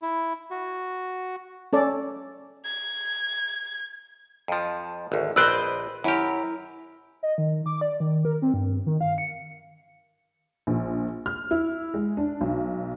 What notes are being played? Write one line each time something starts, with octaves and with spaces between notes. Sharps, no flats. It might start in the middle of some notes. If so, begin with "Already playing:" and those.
E4
F#4
C#4 A4 D5
G#6
F2 F3
G#1 D2
A#1 B4 C5 D5 D#5 G5 E6 F#6
F#2 E4 G4 A#4
D#5
D#3
D6
D5
D#3
A#4
C4
G2
D#3
F5
C#7
A#1
F6
E4
G#3
D4
B1